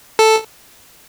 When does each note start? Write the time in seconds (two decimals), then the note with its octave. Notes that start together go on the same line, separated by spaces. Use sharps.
0.19 A4